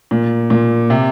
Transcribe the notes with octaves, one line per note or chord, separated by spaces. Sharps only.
A#2
A#2
C3